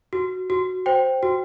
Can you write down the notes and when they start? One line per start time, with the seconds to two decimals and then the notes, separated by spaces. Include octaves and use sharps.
0.13 F#4
0.50 F#4
0.86 C5 G5
1.23 F#4